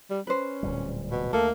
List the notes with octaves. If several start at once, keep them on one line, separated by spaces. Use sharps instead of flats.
G3
C#4 B4 C5
D1 A#2 G3
B2
D2 A3 A#3 A4